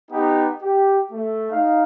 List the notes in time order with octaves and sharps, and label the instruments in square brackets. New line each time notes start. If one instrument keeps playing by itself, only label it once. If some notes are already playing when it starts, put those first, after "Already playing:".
[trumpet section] B3 D#4 G4
G4
A3
D#4 F5